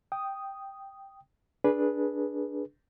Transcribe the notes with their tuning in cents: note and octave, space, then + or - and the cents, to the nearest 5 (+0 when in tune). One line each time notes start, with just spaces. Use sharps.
G5 +0 D#6 +0
D4 +0 G#4 +5 B4 -15